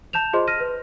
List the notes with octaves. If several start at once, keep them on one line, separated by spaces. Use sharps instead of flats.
A5 G6 E7 F7
F4 G#4 C5 D#5 C6
F6 A#6 D#7
B4